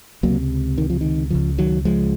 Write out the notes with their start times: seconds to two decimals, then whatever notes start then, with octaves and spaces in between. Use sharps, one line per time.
0.23 C#2 C3 F#3 A#3
0.78 D#3
0.90 F3
1.01 D#3
1.30 C#2 C#3 F3
1.58 D#3 F#3
1.85 F3 G#3